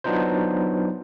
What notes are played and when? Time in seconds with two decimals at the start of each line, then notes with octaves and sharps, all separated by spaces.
0.04 F#3 B3 D4 D#4 F4 C5